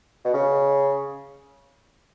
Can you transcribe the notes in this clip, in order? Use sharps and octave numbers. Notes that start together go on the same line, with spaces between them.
B2
C#3